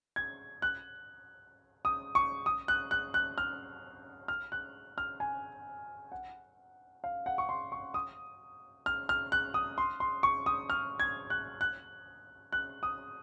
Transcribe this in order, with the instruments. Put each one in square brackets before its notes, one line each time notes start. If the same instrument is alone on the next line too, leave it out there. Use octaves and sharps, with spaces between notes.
[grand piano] G#6
F#6
D#6
C#6
D#6
F#6
F#6
F#6
F6
F6
F#6
F6
G#5
F#5
F5
F#5
C#6
C6
C#6
D#6
F6
F6
F#6
D#6
C6
C6
C#6
D#6
F6
G#6
F#6
F#6
F#6
D#6